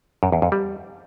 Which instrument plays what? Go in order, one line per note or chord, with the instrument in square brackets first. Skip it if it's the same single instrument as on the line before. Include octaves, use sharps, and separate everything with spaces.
[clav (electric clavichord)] F#2
E2
F2
G3